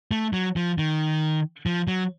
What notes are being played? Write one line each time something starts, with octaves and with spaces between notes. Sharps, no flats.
A3
F#3
F3
D#3
F3
F#3